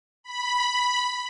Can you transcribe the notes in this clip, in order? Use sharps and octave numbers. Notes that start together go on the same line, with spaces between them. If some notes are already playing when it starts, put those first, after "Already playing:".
B5